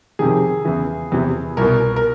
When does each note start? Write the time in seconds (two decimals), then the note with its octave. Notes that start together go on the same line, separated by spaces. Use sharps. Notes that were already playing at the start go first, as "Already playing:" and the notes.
0.19 F2 C3 D#3 G#4
0.65 E2 C#3 E3
1.12 E2 C3 E3
1.57 C2 B2 A#4
1.96 A#4